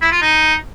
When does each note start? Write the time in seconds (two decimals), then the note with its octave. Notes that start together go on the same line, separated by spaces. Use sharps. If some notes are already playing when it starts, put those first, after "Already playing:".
0.02 E4
0.12 F4
0.22 D#4